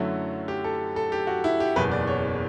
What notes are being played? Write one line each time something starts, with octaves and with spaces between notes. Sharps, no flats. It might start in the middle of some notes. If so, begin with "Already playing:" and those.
Already playing: F#2 D3 F#3 A3 E4
G4
A4
A4
G4
F#4
E4
G4
F#1 E2 B2 B4
D5
C#5